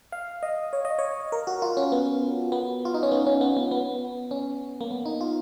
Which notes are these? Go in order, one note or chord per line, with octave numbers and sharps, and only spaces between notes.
F5
D#5
C#5
D#5
C#5
A#4
F#4
F4
C#4
B3
B3
F4
D#4
C#4
B3
C#4
B3
B3
B3
C#4
A#3
B3
D#4
F4